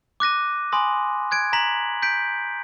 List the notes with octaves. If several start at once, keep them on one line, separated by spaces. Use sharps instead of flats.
D6 F#6 A#6 D#7
G#5 B5 C6 D#6 A#6
F#6 G#6 D7
A#5 A#6 B6 F#7
G6 B6 D7